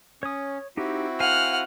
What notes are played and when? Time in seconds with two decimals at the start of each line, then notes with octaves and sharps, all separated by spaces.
0.23 C#4 C#5 D#6
0.77 C4 D#4 E4 F#4 G4
1.20 C5 F5 F#5 G#5 F6